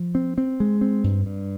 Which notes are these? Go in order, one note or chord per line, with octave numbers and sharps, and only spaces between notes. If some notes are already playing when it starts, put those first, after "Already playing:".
Already playing: F3
C4
C4
G#3
C4
G2
G2